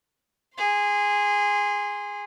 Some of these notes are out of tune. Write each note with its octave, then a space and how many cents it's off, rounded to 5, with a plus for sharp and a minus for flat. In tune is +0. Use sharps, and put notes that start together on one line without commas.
G#4 -15 C6 +0